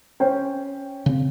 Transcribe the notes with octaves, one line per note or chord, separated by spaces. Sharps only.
C#4 C5 G5
C#3 C4